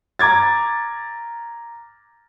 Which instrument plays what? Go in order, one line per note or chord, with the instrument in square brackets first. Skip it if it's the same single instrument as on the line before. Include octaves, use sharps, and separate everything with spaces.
[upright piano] A#5 D6 G#6 A6